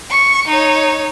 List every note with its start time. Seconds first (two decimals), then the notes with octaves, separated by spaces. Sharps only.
0.11 C#6 C#7
0.48 D#4 C#5